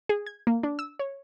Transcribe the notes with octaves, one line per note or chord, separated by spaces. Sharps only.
G#4
G#6
A#3
D4
E6
C#5